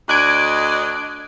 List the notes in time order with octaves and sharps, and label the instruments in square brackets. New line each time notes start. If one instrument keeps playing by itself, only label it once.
[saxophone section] D2 D5 D#5 [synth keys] F#6 G#6 D7